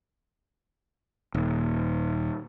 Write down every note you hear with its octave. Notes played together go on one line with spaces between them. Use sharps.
D#1